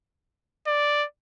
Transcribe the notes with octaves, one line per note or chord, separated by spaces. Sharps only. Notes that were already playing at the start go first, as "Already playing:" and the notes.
D5